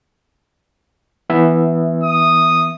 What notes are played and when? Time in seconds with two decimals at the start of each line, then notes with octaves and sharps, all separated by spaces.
1.30 E3 B3 E5
2.04 D#6